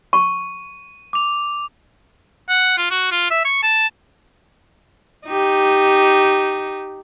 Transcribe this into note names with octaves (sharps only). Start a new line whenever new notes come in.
C#6 D#7
D6 F7
F#5
F4
F#4
F4
E5
C#6
A5
D#4 G4